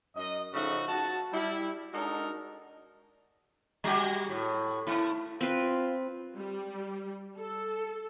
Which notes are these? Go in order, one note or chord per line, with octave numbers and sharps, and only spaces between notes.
F#2 D#5
C#3 F3 A3 D#4 F#4
F#4 A5
G3 E4
G#3 D4 D#4 F#4 A4 A#4
G3 F#4 G4
A2
A3 E4
C4 F4 B4
G3
A4